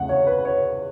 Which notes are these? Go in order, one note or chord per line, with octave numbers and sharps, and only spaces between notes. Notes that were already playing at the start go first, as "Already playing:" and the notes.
Already playing: E2 C#3 A3 F#5
C#5
B4
C#5